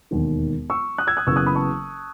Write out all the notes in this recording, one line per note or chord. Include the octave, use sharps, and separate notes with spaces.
E1 D#2 D#3
C#6 E6
D#6 F#6
E6 G#6
D#6 F#6
F#1 F#2 C#3 E3 B3 C#6 E6
D#6 F#6
B5 D#6
A5 C#6